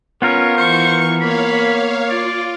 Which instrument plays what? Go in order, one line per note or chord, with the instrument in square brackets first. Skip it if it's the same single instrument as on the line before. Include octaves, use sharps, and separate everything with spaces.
[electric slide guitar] B3 F4 A#4 [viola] C#4 [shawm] C#5
[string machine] E3 [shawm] C5 [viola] C#6
[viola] A#3 [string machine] C#5 F5 [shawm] B5
[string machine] F4 [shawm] D5